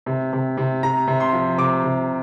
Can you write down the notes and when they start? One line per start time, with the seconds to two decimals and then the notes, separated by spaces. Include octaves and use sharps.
0.06 C3
0.33 C3
0.57 C3
0.83 C3 A#5
1.08 C3
1.20 C6
1.33 F3
1.58 C3 D6
1.84 C3